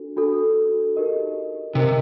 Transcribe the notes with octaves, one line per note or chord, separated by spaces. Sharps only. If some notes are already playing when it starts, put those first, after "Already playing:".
Already playing: D4 F#4 A4
D4 F#4 A4
D#4 G4 A#4 D#5
C3 D#4 G4 A#4 D#5